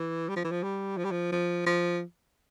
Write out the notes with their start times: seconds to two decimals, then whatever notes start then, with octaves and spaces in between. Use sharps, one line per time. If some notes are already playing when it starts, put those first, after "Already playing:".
Already playing: E3
0.29 G3
0.36 F3
0.44 E3
0.52 F3
0.63 G3
0.98 F3
1.05 G3
1.12 F3
1.32 F3
1.66 F3